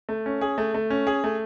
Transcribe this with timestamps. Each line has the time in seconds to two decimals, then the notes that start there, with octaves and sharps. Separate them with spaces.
0.09 A3
0.26 C#4
0.41 G#4
0.58 A3
0.74 A3
0.90 C#4
1.07 G#4
1.24 A3